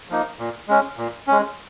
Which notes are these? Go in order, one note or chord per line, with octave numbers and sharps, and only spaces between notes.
F3 A#3 D#4
A#2
G#3 C#4
A#2
G#3 C#4